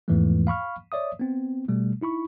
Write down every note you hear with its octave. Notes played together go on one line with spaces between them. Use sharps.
E2 G#2 E3 F3 G#3 A3
F5 B5 C#6 F6
C#5 D5 E5 D#6
B3 C4
B2 G3 A3
D#4 E4 B5 C#6